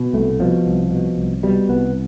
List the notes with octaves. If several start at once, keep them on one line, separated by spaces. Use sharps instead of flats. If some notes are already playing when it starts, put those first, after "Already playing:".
Already playing: B2
C2 A3
B2 F3
C2
B2
C2
B2 G3
C2 B3